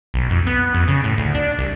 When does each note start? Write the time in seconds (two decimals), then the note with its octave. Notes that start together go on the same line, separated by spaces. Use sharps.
0.14 B1
0.30 F2
0.47 B3
0.74 F2
0.88 C#3
1.04 A2
1.18 D2
1.35 D4
1.59 C2